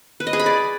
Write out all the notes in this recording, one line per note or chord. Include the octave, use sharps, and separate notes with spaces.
B4
D#5
G#4
B5
D5